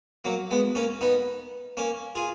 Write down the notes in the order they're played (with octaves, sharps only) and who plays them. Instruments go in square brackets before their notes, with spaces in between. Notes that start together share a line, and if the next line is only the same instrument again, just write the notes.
[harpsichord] F#3 A#3
G#3 B3
A#3 C#4
B3 D#4
A#3 C#4
F4 G#4